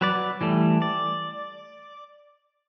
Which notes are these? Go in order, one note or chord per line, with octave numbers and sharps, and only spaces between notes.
F#3 B4 D5
E3 G3 A3
D5